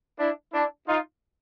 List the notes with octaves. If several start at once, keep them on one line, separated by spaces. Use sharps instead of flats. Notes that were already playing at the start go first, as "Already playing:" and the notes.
D4 E4
D4 E4
D#4 F4